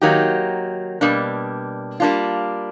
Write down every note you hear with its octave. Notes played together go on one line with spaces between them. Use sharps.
D#3 F#3 A#3 D#4 G4
B2 G3 A#3 D4
G3 A#3 D4 F4